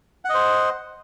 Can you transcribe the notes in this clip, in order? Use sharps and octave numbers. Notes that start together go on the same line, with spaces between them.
C5 D#5 F#5